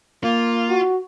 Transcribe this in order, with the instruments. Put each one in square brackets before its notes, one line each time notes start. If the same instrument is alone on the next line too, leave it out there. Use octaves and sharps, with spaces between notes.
[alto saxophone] A#3 [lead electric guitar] F4
[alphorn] F#4